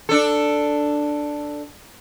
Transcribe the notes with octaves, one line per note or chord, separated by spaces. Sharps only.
D4 A4